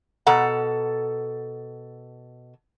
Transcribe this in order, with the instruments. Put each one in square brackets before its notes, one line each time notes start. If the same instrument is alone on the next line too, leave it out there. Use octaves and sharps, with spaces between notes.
[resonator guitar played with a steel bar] B2 A4 F#5 A#5